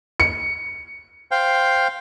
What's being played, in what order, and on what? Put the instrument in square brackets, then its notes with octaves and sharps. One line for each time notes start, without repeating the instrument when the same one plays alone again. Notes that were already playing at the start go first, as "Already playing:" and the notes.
[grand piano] C#7
[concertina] C5 F5 G5